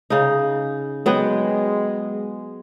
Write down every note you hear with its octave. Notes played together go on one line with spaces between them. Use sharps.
C#3 D#4
F#3 G#3 B3 G5